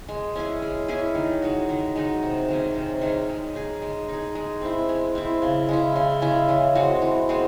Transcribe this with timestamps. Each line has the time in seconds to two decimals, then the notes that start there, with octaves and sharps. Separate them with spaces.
0.09 G#3
0.35 C#4 E4 G#4
0.62 G#3
0.88 C#4 E4 G#4
1.15 D#3
1.42 G#3 D#4 F#4
1.69 D#3
1.96 G#3 D#4 F#4
2.23 C3
2.48 D#3 G#3 C#4
2.76 C3
3.01 D#3 G#3 C#4
3.29 G#3
3.55 D#4 G#4
3.82 G#3
4.08 D#4
4.13 G#4
4.35 G#3
4.61 C4 E4
4.89 G#3
5.15 C4 E4
5.42 C#3
5.69 G#3 C#4 E4
5.96 C#3
6.22 G#3 C#4 E4
6.49 E3
6.75 G#3 C4 F#4
7.02 E3
7.29 G#3 C4 F#4